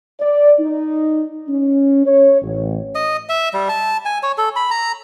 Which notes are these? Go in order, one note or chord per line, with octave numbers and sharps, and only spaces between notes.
D5
D#4
C#4
C#5
A1
D#5
E5
G3
A5
G#5
C#5
A4
B5
A#5